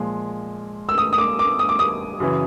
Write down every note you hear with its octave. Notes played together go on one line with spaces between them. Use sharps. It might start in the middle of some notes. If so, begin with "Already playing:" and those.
Already playing: A#2 F3 G#3
E6
D#6
D#6
D6
D6
D#6
D6
D#6
F#2 C#3 E3